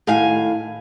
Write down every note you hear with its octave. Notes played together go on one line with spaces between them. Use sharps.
A2 D#3 F5 G#5